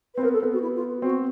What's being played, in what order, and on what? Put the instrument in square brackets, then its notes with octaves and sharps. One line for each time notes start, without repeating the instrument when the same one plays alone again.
[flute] B4
[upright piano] C4
[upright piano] B3 [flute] A#4
[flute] A4
[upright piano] B3
[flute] F#4
E4
F4
[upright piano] C4 [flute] F#4